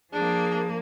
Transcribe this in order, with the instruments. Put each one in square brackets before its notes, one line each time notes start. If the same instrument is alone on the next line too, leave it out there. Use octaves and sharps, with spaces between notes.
[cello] F3 A#3 [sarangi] D4 [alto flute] G#4